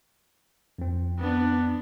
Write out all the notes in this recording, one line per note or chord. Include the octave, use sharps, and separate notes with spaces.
F2 C4
B3 D4